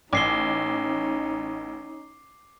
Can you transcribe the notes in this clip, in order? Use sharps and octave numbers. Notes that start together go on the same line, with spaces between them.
A1 C#4 D#4 D6 C7 G7